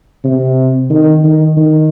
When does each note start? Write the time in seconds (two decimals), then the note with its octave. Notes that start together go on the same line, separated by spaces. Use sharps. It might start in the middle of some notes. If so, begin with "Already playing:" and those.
0.25 C3
0.90 D#3
1.24 D#3
1.57 D#3